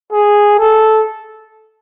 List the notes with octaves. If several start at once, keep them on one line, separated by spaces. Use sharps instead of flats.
G#4
A4